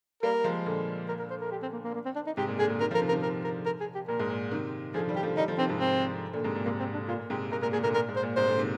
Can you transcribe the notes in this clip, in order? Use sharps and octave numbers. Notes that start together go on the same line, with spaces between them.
G3 A#3 A#4
F3 G#3
A#2 D3
A#4
A#4
C5
A#4
G4
C4
A#3
A#3
A#3
C4
D4
D#4
G#2 C3 G4
A#2
A#2 D3 G#4
A#2 D3
C3 D#3 A#4
D3 F3
A#4
C3 D#3
A#4
C3 D#3
A#4
A#4
A#4
G#4
G4
A#2 A#4
G#2
A#2
C3 D#3
D3 F3 G#4
D#3 G3
G4
D3 F3
D#3 G3 D#4
D3 F3
C3 D#3 C4
G#2 C3
C4
A#2 D3
G#2 C3
A#2
G#2 C3 A#3
C4
D4
A#2 F4
A#2
G#2 C3 G4
G#2 A#4
A#2 A#4
A#2 G#4
A#2 D3 A#4
A#2 A#4
G#2
C5
A#2
G#2 C3 C5
A#2 D3
C3 D#3